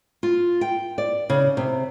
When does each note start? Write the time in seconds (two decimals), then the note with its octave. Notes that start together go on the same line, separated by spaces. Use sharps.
0.23 F4
0.61 G5
0.98 D5
1.30 C#3
1.57 C3